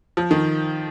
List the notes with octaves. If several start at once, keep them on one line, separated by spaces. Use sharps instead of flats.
F3
D#3